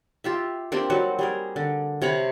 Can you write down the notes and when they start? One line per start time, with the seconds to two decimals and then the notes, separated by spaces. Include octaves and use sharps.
0.24 F4 G4 E5
0.72 A#3 C4 D4 G4
0.90 F#3 G3 D#4 F#4
1.19 G3 G#4 A#4
1.56 D3
2.02 C3 C#5 A#5 B5